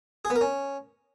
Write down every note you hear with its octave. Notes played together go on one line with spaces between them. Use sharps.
G#4
B3
A#4
C#4